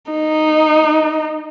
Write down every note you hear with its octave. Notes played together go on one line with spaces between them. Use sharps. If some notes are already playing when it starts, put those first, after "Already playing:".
D#4